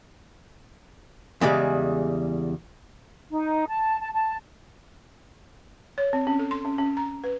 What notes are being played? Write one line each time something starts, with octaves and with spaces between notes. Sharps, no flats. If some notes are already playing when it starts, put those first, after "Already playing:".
E2 C#3 G3 G#3
D#4
A5
A5
A5
C#5
C4
C#4
A4
C6
C#4
C#4
A#5
B4